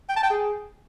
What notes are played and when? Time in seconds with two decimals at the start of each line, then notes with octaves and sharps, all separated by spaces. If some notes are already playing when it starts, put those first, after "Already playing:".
0.09 G5
0.16 A5
0.23 G5
0.30 G#4